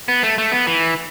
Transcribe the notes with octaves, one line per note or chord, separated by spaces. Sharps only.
B3
A3
A3
B3
E3